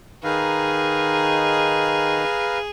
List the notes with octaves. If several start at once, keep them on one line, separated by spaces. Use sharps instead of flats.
D#3 D#4 G#4 B4 F5 A#5